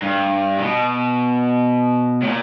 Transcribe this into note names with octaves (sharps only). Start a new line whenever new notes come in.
G2
B2
A2
A#2